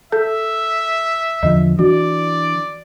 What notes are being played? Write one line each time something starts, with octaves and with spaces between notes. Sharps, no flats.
A4 E5
E2 D3 F3 D#5
E3 D4 F#4 D5